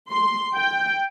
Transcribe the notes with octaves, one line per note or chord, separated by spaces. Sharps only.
C6
G5